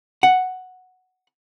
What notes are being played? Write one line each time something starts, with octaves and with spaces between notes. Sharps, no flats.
F#5